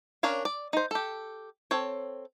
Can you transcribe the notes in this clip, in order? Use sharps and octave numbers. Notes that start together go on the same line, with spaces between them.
C#4 D4 A#4 C#5 F5
D5
D#4 C5
G4 A4
C4 A4 C#5